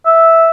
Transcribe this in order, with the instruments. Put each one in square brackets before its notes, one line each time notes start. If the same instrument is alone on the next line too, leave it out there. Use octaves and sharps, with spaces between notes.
[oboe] E5